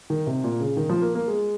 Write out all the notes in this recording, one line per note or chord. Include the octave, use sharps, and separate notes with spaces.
D#3
C3
A#2
C#3
D#3
F3
A#3
A#3
G#3